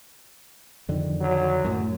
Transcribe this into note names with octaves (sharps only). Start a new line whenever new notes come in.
F2 D3 D#3
F#3
F#2 A2